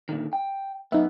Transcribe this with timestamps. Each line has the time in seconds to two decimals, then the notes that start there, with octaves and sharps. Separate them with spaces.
0.09 A#2 D3 D#3
0.33 G5
0.92 F#2 B3 D#4 E5